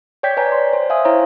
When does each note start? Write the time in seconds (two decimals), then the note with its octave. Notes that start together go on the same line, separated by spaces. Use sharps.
0.23 C#5 D5 G5 G6 G#6 B6
0.37 B4 C#5 D5 G#5 A#5
0.52 C6
0.73 C5
0.90 E5 F5 G#5 D#6
1.05 E4 C5 C#5 A#5